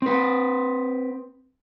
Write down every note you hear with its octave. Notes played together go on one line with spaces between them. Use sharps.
C4 B4